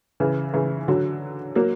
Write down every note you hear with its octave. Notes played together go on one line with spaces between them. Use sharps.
C#3 E3
C#3 E3
D3 F#3
F#3 A#3